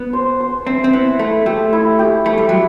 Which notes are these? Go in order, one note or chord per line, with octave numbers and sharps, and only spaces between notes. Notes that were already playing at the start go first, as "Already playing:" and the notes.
Already playing: B3
C5
C5
C4 E5
C4
B3 E4
A3 E4
A3 G4
E4
G4
A3 E4
G3
F#3 G4